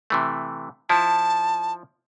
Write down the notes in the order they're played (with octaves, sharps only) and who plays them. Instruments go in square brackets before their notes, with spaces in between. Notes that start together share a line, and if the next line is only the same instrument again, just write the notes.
[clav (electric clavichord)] C3 E3 A3
[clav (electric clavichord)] F3 E4 [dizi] A5